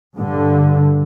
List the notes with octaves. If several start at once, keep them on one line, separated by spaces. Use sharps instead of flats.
G2 D3